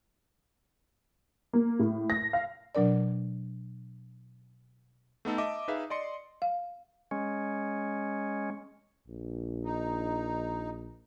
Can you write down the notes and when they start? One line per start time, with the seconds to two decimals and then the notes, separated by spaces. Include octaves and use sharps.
1.53 A#3
1.79 A2
2.10 A#6
2.33 F5
2.75 B2 F#3 D4 A#4 D5
5.25 A3 B3 D#4 A4
5.38 D#5 E5 A5 D6
5.68 D#4 G#4 B4 E5 F5
5.90 D5 D#5 C6 C#7
6.42 F5
7.11 G#3 C#4
9.07 A#1
9.65 D#4